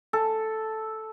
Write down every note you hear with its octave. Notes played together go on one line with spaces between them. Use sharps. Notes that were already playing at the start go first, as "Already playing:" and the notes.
A4